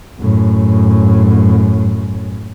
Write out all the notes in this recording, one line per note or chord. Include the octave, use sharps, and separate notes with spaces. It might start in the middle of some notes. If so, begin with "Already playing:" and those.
F#2 A2